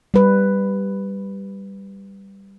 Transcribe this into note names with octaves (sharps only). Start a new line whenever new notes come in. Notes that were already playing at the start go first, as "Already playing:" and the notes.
G3 B4